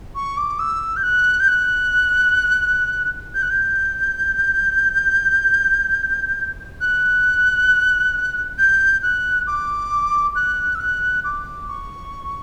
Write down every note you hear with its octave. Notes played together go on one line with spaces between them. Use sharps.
C#6
D6
E6
G6
F#6
G6
F#6
G6
F#6
G6
F#6
G6
F#6
D6
F#6
E6
F#6
D6
C#6